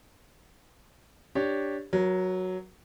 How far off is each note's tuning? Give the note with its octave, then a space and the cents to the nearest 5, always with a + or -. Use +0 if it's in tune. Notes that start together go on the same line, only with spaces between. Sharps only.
D4 +0 G4 +0 C#5 +0
F#3 +0 A#4 +35